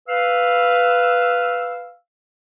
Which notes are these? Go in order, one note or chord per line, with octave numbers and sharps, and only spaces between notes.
B4 F5 E6